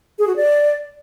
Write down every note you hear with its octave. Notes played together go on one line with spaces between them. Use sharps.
G#4
F#4
D5